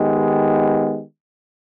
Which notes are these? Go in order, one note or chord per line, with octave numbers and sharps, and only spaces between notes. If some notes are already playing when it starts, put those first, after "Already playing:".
Already playing: D#3 G#3 B3 D#4 G4